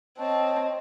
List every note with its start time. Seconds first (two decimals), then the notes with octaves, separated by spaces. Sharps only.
0.18 C4 C#5 D#5 A5 C#6